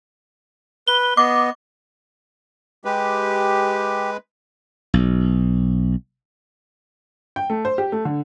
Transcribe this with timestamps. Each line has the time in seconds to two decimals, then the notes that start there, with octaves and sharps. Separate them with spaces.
0.88 B4 G7
1.17 B3 D#5 D6
2.85 G#3 G4 B4
4.94 B1
7.36 G5
7.50 A3
7.65 C5
7.78 G4
7.92 A3
8.05 D3